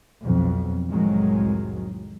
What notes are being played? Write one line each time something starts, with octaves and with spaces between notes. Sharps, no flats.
B1 F2
C2 F2 A2 D#3 F#3 G#3